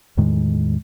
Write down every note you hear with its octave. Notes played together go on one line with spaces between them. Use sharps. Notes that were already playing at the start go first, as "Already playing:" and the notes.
E2 A2 D#3 G#3